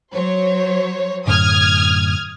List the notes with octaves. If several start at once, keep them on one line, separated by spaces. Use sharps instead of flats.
F#3 C5 C#5
F#2 A2 D3 D#6 F6 G#6